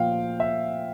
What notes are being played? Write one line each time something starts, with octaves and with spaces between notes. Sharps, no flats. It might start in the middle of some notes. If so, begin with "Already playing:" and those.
Already playing: A#2 F3 F5 G5
E5